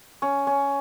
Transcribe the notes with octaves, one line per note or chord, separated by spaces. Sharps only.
C#4
C#4